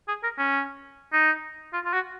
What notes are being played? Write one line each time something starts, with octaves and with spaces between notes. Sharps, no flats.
G#4
A#4
C#4
D#4
F4
F4
F#4